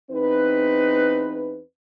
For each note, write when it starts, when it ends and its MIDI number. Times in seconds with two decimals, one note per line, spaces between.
0.11 1.61 40
0.11 1.61 60
0.11 1.61 63
0.11 1.61 71